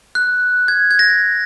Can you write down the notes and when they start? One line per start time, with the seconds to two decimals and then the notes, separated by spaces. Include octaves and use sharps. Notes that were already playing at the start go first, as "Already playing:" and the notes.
0.15 F#6
0.68 G#6
0.91 G#6
0.99 A#6